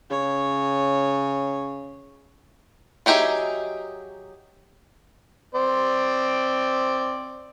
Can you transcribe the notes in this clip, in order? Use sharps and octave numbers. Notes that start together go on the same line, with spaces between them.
C#3 C#5
F#3 D#4 G4 G#4 E5
C4 C5 D5